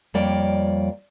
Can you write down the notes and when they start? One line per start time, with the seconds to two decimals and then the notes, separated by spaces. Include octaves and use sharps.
0.14 F2 G3 A#3 C#5 D5 G5